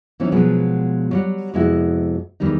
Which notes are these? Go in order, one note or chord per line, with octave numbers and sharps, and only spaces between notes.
E3 F#3 C4 C#4 D#4
B2 F3 F#3 G#3 B3
F#3 G3 F#5
F2 C3 G#3 B3 E4 F#4
E2 D#3 G3 D#4